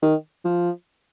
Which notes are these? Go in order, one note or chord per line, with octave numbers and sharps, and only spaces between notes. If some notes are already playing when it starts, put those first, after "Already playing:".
D#3
F3